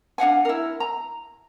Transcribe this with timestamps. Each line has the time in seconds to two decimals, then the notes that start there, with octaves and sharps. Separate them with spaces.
0.18 D4 F5 F#5 G#5
0.45 E4 A#4
0.80 A#5